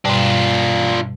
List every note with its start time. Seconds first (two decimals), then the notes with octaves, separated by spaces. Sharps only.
0.05 G2 B2 G3 D4 F4